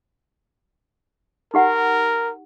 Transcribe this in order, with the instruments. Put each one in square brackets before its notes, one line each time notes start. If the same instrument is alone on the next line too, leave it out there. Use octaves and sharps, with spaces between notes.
[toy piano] D#4 G4 F#5 [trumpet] A#4